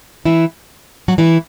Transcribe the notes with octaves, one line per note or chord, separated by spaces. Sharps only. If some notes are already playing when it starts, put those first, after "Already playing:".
E3 E4
F#3 F#4
E3 E4